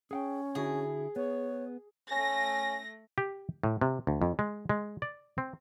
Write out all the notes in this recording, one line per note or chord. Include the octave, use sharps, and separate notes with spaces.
C#4 G#4 F#5 G5
D3 E4 F#4 G#4
B3 C#5
A3 C#4 A#6
G4
A2
C3
D2
F2
G#3
G#3
D5
C4